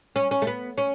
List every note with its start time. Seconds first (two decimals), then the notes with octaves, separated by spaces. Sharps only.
0.16 C#4
0.31 C#4
0.42 A3
0.47 B3
0.78 C#4